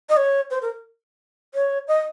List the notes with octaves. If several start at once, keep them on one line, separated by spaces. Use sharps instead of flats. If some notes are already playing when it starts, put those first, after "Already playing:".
D#5
C#5
C5
A#4
C#5
D#5